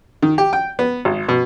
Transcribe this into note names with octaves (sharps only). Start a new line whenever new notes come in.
D#3
G4
G5
B3
G#1
B2